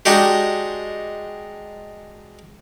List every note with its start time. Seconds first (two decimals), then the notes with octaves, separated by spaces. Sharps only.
0.05 G#3 D4 D#4 F#4 G4